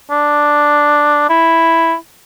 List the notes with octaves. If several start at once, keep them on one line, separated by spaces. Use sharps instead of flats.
D4
E4